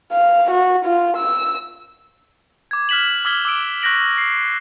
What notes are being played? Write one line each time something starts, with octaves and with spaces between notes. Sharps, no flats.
F5
F#4
F4
E6
D6 G#6
F6 F#6 B6 E7 F#7
D6 E6 F6 G#6 B6 G7
D6 E6 D7
C#6 F#6 G6 A#6 D7 F#7
C7